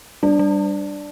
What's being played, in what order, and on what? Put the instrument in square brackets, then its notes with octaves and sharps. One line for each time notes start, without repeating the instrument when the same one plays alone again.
[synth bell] G3 [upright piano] D4
[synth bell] G3